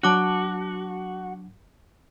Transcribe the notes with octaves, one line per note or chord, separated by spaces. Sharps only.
F#3 D4 F#4 A5 D6 F#6